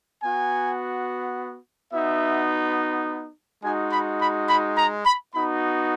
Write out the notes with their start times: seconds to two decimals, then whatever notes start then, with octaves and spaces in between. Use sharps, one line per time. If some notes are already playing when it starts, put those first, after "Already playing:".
0.22 B3 F#4 G#5
1.93 B3 D#4 F#4 E5
3.64 G#3 D#4 F#4 G#5
3.92 B5
4.20 B5
4.49 B5
4.78 A#5
5.05 B5
5.34 B3 D#4 F#4 B5